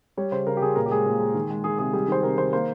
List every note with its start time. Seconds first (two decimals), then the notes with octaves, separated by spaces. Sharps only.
0.17 G3 C#5
0.32 C#3 C5
0.47 C#3 A#4
0.57 G4
0.61 C#3 G#4
0.76 A#2 A#4
0.86 G4
0.91 G#3 G#4
1.06 A#2
1.20 G#3
1.35 D#3
1.50 G#3
1.64 D#3 G#4
1.79 C3 G#4
1.93 G3 G#4
2.08 D#3 C5
2.23 C3 A#4
2.38 D#3 C5
2.53 A#3 C5